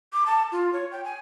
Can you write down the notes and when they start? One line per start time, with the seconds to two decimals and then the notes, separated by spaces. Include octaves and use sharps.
0.13 D6
0.26 A5
0.52 F4
0.73 C#5
0.92 G5
1.05 G#5